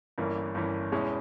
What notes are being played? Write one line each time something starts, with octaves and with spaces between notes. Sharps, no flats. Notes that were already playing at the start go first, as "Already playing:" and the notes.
G1 G2 E3 A#3 C#4
G1 G2 E3 A#3 C#4
E2 B2 G#3 C#4 E4